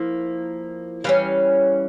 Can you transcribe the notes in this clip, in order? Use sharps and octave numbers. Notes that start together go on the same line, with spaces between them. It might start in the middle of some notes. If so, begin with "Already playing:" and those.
Already playing: F3 A#3 E4
E3 G3 C#4 F5